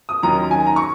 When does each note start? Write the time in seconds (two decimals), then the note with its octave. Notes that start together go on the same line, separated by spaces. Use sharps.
0.09 D#6
0.22 D#2 D#3 F#3 C#4 A#5
0.51 G#5
0.66 A#5
0.76 C#6